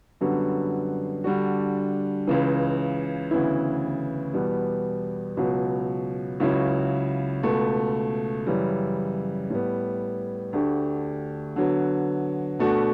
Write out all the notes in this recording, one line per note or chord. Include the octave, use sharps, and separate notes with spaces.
F#2 D3 G3 B3 F#4
D3 G3 D4 F#4
C#2 C#3 E3
D2 C#3 E3 B3 E4
E2 B2 G3 B3
C#2 B2 F#3
C#2 C#3 F#3 C#4 E4
C#2 B2 A3
F#2 C#3 E3 G3
A2 G3 B3
D2 D3 A3 D4 G4
D3 F#3 B3
B2 A3 D4 F#4